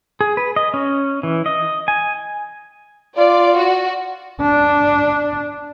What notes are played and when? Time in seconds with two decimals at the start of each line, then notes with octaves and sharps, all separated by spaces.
0.21 G#4
0.37 B4
0.56 D#5
0.74 C#4
1.23 E3
1.46 D#5
1.88 G#5
3.18 F4 D5
3.58 F#4
4.42 D4